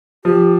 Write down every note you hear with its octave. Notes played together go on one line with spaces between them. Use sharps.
F3 G4